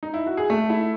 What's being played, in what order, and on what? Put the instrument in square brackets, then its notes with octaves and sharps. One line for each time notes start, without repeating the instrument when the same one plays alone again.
[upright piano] D#4
E4
F#4
G#4
[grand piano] A3 [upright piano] A4
[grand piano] E4